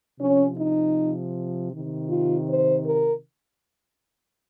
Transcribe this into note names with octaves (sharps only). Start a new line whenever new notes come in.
C3 F3 C#4
D#4
C3 D#3
F4
C5
A#4